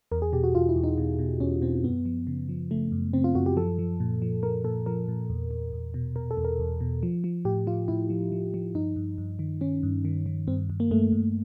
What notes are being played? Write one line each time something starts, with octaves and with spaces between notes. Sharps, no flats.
E2 A#4
G#4
B2 G4
F#4
E2 F4
E4
E2
D#4
B2
B2
E2 C#4
B2 C4
F#2 B3
F3
C#3
F3
C#3 A3
F#2
C#3 C4
F4
F#2 F#4
G4
F3 A4
F3
A#2
F3
F3 A#4
A#2 A4
F3 A#4
A#2
E2
E2
E2
B2
B2 A#4
A4
E2
A#4
E2
B2
F3
F3
A2 G4
F3 F4
A2 E4
F3
F3
F3
G2 D#4
G2
G2
D#3
D#3 C#4
G2
D#3
D#3
G2 C4
G2
A#3
G2 A3
G2